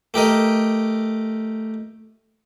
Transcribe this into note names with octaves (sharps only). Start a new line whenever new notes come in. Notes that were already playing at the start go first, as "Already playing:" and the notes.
A3 G4 A#4 D#5